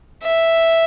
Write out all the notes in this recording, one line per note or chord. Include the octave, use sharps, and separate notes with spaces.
E5